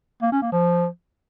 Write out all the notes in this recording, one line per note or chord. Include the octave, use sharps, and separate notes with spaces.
A#3
C#4
A#3
F3